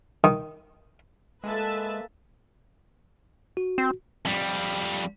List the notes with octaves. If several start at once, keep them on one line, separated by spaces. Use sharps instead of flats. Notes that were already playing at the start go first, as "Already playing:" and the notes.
D#3
G#3 A#3 A4 B4 E5 G#5 A5
F#4
C4
F2 G3